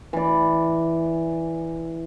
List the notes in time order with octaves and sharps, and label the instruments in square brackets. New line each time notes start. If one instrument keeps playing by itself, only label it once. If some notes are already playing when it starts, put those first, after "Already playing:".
[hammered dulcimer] E3 D5